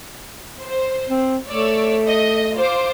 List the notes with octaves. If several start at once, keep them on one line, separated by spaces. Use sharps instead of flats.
C5
C4
A3 C#5 D5 E6
D#5
F4 C5 D6